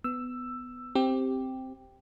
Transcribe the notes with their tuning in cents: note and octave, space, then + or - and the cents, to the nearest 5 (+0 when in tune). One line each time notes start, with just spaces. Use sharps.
B3 +15 E6 +10
C4 +0 G4 +0